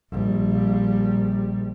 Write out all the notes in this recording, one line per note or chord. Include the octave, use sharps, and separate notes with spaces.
A#1 G3